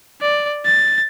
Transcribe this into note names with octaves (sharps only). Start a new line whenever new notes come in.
D5
A6